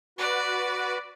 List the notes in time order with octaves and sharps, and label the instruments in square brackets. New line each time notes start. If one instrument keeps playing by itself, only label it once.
[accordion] F#4 B4 [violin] D5